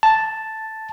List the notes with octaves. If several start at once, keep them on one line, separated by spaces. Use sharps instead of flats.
A5